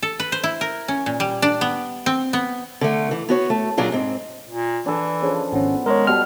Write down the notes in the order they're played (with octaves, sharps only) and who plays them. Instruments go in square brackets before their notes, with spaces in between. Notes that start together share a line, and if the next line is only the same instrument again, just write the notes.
[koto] A4
B4
C5
E4
A#4
C#4
A#2
G3
D4
B3
C4
B3
[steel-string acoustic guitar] D3 A3
E3
B3 F#4 C#5
A3
A#2 F#3 D4 F4 G#4
G#2 C4
[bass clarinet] A#2
[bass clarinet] E3 [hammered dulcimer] D4 A4
[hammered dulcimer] C#3 F3
[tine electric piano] G#1 C#4 [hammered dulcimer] B3
[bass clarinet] G#3 [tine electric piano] A#4 C#5
[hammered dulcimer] B2 G3 A4 [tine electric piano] F6